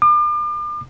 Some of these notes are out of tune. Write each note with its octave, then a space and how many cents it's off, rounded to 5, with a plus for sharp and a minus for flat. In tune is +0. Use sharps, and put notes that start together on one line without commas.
D6 +40